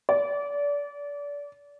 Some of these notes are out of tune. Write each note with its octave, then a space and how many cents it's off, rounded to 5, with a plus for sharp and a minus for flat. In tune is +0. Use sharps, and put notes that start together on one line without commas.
D5 -30